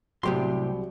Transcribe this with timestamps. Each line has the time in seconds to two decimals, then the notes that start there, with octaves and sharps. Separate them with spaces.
0.23 C2 A2 C3 F#3 G4 C6